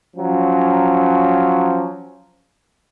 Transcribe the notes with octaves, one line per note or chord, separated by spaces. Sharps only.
F3 F#3 C#4